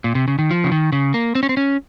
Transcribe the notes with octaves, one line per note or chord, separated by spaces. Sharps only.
A#2
C3
C#3
D#3
F3
C#3
D#3
C#3
A#3
C4
C#4
C4
C#4